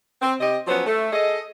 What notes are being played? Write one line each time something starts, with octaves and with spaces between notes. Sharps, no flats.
C4
C3 G4 D#5
F3 F#3 B3 C#4 C5
A3
G#4 A4 D#5